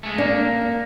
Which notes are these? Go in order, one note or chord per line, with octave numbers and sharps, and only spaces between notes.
G#3 A3
A#3 D4